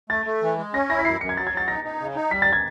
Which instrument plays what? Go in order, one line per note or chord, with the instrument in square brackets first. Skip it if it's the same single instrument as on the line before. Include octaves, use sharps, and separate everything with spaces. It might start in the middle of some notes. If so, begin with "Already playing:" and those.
[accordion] A3 [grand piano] A6
[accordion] A3
E3
G#3
[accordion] C#4 [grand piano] A#6
[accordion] E4 [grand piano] A#6
[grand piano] B6
[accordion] F#2 [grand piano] C7
[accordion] F#2 [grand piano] C#7
[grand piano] G#6
[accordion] F#3 [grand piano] A6
[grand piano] G#6
[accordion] F#3 [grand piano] A6
[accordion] D#4 [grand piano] A#6
[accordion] D#4
C#3
D#4
[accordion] G3 [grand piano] B6
[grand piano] A6
G#6